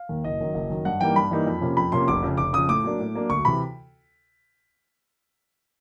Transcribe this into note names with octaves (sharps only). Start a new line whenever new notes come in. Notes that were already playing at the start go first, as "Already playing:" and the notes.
Already playing: F5
D#2 D#3
F#1 D#5
F#2 D#3 F#3
F#1
F#2 D#3 F#3
G2 F#5
E3 G3 A#3 D#4 G5
G2 B5
E3 G3 A#3 D#4
F2
C3 F3 A#3 C#4
F2 B5
C3 F3 A#3 C#4 C6
F1 D6
F2 C#3
F1 D6
F2 C#3 D#6
A2 D6
F#3 A#3 D4
A2
F#3 A#3 D4
D2 C#6
C3 E3 B5